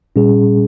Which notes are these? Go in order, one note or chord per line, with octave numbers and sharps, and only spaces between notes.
A#2 G3 C#4 G#4